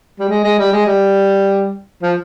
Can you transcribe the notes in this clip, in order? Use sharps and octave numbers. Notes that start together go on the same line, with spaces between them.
G3
G#3
G#3
G3
G#3
G3
F3